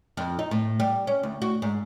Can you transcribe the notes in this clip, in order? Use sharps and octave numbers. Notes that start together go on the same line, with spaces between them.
F2
D#4
A2
G3
C#4
D2
F#4
G#2